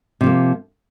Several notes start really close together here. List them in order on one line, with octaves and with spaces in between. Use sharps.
C3 F3 A#3